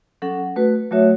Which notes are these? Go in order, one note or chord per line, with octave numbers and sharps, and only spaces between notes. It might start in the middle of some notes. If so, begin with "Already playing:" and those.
F#3 C#4 A4 F#5
A3 F#4 B4
F#3 A3 F#4 C#5 E5